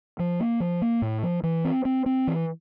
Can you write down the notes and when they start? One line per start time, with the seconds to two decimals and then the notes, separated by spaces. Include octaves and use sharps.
0.19 F3
0.40 A#3
0.60 F3
0.82 A#3
1.02 A2
1.23 F3
1.43 E3
1.65 C4
1.85 C4
2.06 C4
2.27 E3